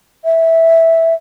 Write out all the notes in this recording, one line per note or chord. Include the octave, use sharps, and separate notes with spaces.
E5